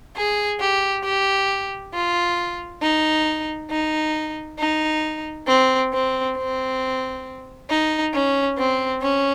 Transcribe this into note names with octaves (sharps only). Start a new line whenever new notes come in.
G#4
G4
G4
F4
D#4
D#4
D#4
C4
C4
C4
D#4
C#4
C4
C#4